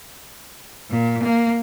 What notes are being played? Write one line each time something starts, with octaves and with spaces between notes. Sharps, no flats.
A#2
A#3